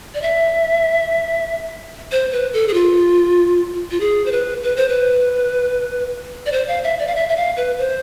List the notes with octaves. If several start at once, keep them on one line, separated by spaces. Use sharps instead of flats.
D5
E5
C5
B4
A4
G#4
F4
F4
G#4
C5
B4
B4
C5
B4
D5
C5
F5
E5
D5
F5
E5
E5
F5
B4
C5